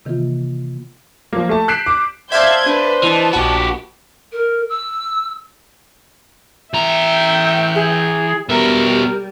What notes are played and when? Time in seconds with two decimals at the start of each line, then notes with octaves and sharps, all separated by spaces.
0.05 C3 D#3 E3 A#3 F4
1.33 F3 A#3
1.49 A3 A5
1.68 F#6 G6 B6 C7 D7 E7
1.86 D6
2.32 C5 D5 E5 F5 A5 G6 G#6
2.66 D4 B4
3.03 E3 D#5 A5
3.33 A#1 F#4 G4 B5
4.32 A#4
4.69 E6
6.74 E3 E5 G5 A#5
7.75 G#4
8.49 B2 G3 A#4 E5